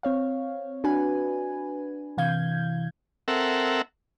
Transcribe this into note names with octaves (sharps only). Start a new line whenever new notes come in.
C4 C#5 F5
D4 F#4 B4 G#5
C3 E3 F5 G6 G#6
C4 A4 A#4 E5 F#5